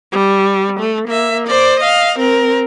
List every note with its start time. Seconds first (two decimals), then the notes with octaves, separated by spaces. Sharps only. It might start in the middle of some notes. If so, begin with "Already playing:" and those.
0.12 G3
0.80 A3
1.08 A#3 E5
1.47 C5 D5
1.80 D#5 F5
2.19 C4 A#4